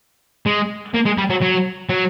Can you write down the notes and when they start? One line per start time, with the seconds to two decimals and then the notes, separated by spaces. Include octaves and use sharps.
0.46 G#3
0.94 A#3
1.06 G#3
1.18 G3
1.30 F#3
1.42 F#3
1.89 F#3